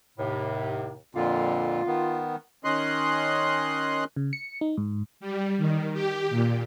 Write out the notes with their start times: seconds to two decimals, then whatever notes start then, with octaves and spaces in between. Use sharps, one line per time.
0.18 D#2 A2 C3
1.15 F2 A#2 D3 F4
1.87 D#3 B3
2.64 D#3 C#4 D#5 C6 F#6
4.16 C#3
4.33 C#7
4.61 D#4
4.77 G#2
5.20 G3
5.58 D#3
5.93 G4
6.30 A#2